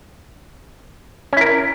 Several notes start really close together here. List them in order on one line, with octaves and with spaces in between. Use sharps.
C#4 E4 A#4